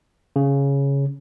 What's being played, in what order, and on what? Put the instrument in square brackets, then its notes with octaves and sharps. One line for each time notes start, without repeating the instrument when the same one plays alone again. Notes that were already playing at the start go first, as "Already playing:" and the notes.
[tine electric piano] C#3